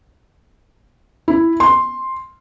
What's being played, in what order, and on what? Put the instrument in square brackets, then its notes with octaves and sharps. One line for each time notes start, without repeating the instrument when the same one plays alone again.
[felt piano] E4
C6